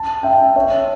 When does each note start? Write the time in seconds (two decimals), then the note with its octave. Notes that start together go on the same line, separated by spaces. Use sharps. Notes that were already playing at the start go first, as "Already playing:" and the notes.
Already playing: A5
0.23 E5 G5
0.56 C#5 E5